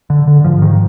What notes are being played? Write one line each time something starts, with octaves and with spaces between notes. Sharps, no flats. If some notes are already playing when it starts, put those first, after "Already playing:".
D3
D3
G#2 F3
G#2 D#3